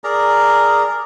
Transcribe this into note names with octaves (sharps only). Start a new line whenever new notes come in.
G#4 A#4 D5 A#5